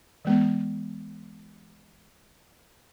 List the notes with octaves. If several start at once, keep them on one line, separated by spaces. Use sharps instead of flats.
E3 G#3 B3